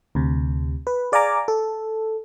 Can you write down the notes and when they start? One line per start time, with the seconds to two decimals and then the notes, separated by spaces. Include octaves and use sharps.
0.15 D2 C3
0.87 B4
1.12 G#4 D5 F5 G#5 A#5 D6
1.48 A4